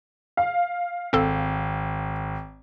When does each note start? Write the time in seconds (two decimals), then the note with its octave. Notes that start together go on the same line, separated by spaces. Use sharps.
0.37 F5
1.13 G#1 C4 A4